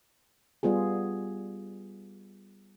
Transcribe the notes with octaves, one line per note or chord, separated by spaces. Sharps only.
G3 B3 F4 G#4